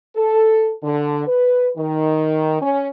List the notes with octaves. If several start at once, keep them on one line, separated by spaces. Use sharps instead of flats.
A4
D3
B4
D#3
C#4